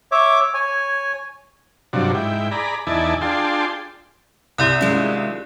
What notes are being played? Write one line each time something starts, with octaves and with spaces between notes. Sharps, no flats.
C#5 E5 D6
C#5 G#5
G2 C3 F3 F#3 D4
G#2 E4 G5
G#4 D5 A#5 B5
E2 D#4 E4 D5 G#5 A5
D4 F4 G#4 G5 A5 C6
C2 G4 D5 F#6
D#3 G#3 C#4 F4